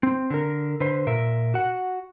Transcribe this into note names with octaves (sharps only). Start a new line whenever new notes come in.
C4
D3 A#4
D3 B4 C5
A#2 A#4 E5
F#4 F#5